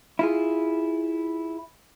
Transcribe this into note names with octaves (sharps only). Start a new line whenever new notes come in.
E4 F4 G#4